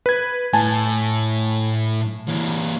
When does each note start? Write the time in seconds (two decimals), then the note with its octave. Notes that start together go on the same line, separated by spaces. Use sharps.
0.06 B4 G#6
0.53 A2 G#5 A5
2.27 E3 A#3